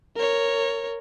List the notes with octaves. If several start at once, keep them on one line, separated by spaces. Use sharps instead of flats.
A#4 C#5